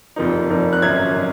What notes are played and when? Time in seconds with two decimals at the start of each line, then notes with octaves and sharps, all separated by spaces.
0.16 F1 F2 F3 A#3 D#4
0.49 F1 F2 F3 A#3 D#4
0.73 F#6
0.82 G#1 F#2 D#3 G#6
1.14 D#3